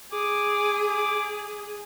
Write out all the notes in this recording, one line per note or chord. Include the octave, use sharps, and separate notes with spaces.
G#4 D6